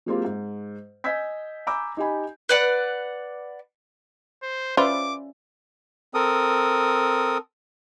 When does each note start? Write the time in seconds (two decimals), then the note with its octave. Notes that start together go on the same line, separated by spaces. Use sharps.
0.06 F#3 G#3 A#3 C4 F4 G4
0.25 G#2
1.04 D#5 G#5 E6 G6 G#6 B6
1.67 G#5 A#5 B5 D6 E6 G6
1.97 D#4 G4 D#5 G#5 B5
2.49 B4 D5 F#5
4.43 C5
4.77 C#4 F4 B4 C5 D5 E5 D6
6.14 C4 A4 A#4 D#6